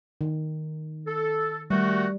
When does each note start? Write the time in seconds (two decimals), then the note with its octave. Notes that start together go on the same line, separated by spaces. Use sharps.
0.21 D#3
1.07 A4
1.70 D#3 G3 A3 F#4